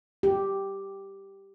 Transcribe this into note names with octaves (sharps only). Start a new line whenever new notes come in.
G4